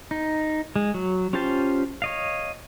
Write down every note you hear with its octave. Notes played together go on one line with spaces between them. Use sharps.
D#4
G#3
F#3
C#4 F4 G4 C5 A5
C#5 D#5 F5